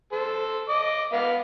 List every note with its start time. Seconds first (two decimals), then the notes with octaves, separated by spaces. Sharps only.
0.12 A4 C5
0.69 D#5 D6
1.12 B3 F5